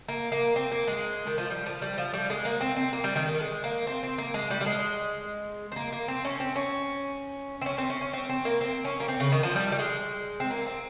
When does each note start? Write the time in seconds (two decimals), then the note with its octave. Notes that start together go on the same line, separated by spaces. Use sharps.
0.08 A#3
0.32 A#3
0.56 C4
0.71 A#3
0.88 G#3
1.27 D#3
1.38 F3
1.50 G3
1.66 F3
1.82 G3
1.98 F3
2.14 G3
2.30 G#3
2.45 A#3
2.61 C4
2.76 C4
2.93 A#3
3.04 G3
3.16 D#3
3.28 D#3
3.40 G#3
3.64 A#3
3.87 C4
4.03 C4
4.18 A#3
4.34 G#3
4.50 G3
4.61 G3
4.66 G#3
5.72 C4
5.76 A#3
5.92 A#3
6.08 C4
6.25 C#4
6.40 C4
6.56 C#4
7.61 C4
7.66 C#4
7.78 C4
7.90 C#4
8.01 C#4
8.13 C4
8.29 C4
8.45 A#3
8.61 C4
8.85 C#4
9.00 A#3
9.08 C4
9.20 C#3
9.32 D#3
9.43 F3
9.55 G3
9.72 G3
9.79 G#3
10.40 C4
10.51 A#3
10.66 C4